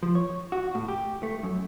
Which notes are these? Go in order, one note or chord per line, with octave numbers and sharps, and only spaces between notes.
F3
C#5
F#4
A2
G4
A3
F#2